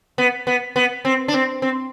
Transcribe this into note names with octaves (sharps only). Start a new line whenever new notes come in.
B3
B3
B3
C4
D4
C4
C4